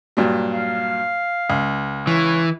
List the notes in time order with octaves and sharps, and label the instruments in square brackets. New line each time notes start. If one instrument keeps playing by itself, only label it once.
[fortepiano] G2 A#2 F#3
[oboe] F5
[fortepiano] C#2
[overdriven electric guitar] E3 [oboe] C#5